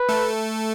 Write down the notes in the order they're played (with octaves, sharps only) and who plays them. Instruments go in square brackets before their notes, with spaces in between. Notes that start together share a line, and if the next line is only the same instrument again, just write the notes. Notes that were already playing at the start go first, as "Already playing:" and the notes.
Already playing: [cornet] B4
[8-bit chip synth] A3 A4